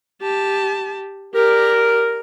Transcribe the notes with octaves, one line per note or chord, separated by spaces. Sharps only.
G4 A5
G4 A#4 D5